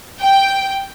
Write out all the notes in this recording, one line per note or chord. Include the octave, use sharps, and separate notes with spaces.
G5